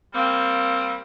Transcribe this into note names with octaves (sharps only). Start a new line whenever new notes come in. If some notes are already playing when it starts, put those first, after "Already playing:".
G3 A#3 C4